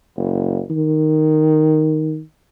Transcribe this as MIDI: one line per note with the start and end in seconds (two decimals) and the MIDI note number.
0.17 0.61 30
0.70 2.20 51